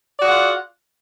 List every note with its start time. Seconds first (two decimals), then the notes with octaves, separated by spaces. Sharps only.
0.18 D5
0.21 F#4
0.24 G#4
0.27 F#5
0.29 F4